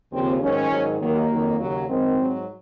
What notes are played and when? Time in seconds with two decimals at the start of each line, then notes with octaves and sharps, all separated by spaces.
0.12 D#2 C#3 F3 C4
0.42 G#2 D#3 F#3 C#4
0.71 G#2 D#3 F#3
1.00 D#2 D#3 F#3 A#3
1.30 F2 D#3 F#3
1.60 D#2 C#3 F#3
1.88 F#2 D#3 G#3 C4
2.18 G#2 F#3